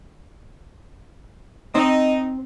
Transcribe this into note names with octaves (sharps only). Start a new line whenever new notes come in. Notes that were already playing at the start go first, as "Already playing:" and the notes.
C4 D#4